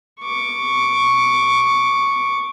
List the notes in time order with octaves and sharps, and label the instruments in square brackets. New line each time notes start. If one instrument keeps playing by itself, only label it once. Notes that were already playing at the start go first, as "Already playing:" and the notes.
[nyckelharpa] C#6 D6